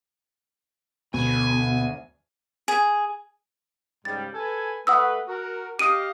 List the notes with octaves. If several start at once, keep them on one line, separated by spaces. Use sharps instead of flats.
D2 B2 G#5
G#4
G#2 C#3 G3 A6
A4 B4 G#5
A3 B4 F#5 D#6 E6
F#4 A#4
G4 D#5 F5 D#6 D7 D#7